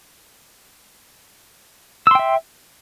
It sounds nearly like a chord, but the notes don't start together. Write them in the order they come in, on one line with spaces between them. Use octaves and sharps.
E6 C6 G5 E5